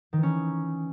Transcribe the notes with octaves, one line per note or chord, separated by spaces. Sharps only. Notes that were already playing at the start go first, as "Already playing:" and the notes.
D#3
E3
C#4